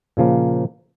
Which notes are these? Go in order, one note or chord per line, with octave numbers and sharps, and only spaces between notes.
A#2 C#3 F3 A#3